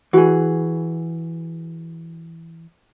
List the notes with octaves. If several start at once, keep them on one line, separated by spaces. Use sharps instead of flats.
E3 F#4 G#4